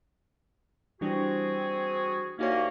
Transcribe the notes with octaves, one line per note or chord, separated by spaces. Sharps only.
E3 G3 C4 D4 F#4 G#4
C2 A#3 C#4 D#4 F#4 C#5